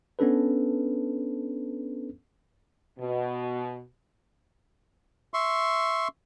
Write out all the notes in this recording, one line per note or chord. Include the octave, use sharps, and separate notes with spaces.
B3 C#4 D4 A4 B4
B2
E5 C6 C#6